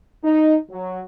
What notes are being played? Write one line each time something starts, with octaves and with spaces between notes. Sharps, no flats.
D#4
F#3